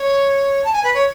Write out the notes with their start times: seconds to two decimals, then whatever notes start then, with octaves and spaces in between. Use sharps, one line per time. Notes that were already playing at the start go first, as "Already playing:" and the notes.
Already playing: C#5
0.64 A5
0.73 G#5
0.83 B4
0.94 C#5